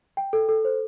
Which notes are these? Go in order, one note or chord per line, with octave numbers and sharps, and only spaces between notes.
G5
A4
A4
C5